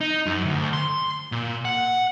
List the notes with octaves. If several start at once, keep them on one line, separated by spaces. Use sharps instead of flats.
D#4
F#2
D2
C6
A#2
F#5